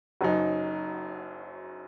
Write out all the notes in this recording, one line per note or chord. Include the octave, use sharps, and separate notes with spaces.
F#1 F#2 F#3 D#4